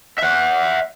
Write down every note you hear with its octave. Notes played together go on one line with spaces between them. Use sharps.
E5 F#5